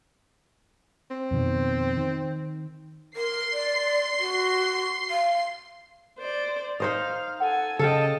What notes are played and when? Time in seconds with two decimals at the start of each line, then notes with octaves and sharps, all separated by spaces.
1.11 C4
1.31 F2 B2 D#3
1.97 D#3
3.16 A#4 C6 C7
3.53 D5
4.20 F#4
5.10 F5
6.19 C5 D5
6.80 D#4 C5 D#5 F5
7.40 A4 F#5 G#5
7.79 C#3 A4 D#5 F5 G5 A5